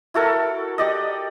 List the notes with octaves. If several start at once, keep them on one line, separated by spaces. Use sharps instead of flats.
E4 F#4 A4 A#4
G4 D5 D#5